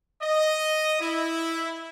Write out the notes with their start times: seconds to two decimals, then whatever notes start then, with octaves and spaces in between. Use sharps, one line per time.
0.21 D#5
1.00 E4